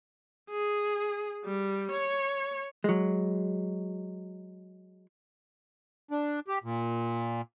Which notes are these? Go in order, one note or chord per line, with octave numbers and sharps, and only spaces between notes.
G#4
G3
C#5
F#3 G#3
D4
G4
A#2